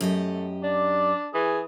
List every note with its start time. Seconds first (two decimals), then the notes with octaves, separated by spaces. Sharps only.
0.01 F#2 A3 G4 D#5
0.63 D4 D5
1.34 E3 G#4